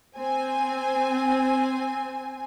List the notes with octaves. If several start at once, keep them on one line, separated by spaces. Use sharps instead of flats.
C4 G#5